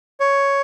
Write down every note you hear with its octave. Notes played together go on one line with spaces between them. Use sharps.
C#5